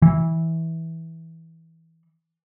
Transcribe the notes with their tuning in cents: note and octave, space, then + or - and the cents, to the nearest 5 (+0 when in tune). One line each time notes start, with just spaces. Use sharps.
E3 -15